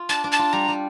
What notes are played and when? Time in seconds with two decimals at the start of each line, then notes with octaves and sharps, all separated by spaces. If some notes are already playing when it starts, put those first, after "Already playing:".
Already playing: F4
0.09 D4 A5
0.24 D4
0.32 A5
0.39 F4
0.53 G3 A#5
0.69 G3